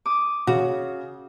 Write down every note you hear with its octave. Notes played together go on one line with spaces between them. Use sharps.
D6 D#6
C#3 F#4